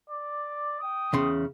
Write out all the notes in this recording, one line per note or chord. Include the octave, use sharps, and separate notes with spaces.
D5
G5 D#6
E2 C#3 C6